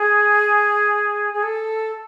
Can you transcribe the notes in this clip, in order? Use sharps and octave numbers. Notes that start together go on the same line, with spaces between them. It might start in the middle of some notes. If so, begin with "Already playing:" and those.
Already playing: G#4
G#4
A4